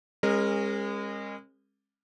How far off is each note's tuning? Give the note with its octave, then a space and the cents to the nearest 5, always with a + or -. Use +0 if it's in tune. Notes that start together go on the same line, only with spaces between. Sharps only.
G#3 -30 C#4 -40 A#4 +0